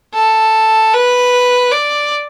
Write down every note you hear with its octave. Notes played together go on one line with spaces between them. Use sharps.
A4
B4
D5